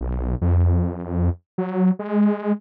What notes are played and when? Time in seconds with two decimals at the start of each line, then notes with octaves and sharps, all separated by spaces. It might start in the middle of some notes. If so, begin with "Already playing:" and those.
0.01 B1
0.41 F2
1.58 F#3
1.99 G#3